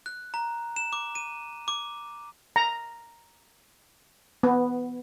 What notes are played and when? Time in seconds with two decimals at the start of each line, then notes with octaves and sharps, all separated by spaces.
0.06 F#6
0.34 A#5
0.76 E7
0.93 D6
1.15 D#7
1.68 D6
2.56 A#5
4.43 B3